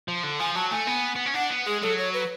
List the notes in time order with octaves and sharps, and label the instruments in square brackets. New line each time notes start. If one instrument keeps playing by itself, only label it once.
[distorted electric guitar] F3
D3
[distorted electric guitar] F3 [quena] G#5
[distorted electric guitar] F#3 [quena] A5
[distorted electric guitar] A3 [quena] G#5
[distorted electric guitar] B3
B3
C#4
[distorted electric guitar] D4 [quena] F#5
[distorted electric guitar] B3
[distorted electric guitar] G#3 [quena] G#4
[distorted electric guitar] F#3 [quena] A4
[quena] C#5
B4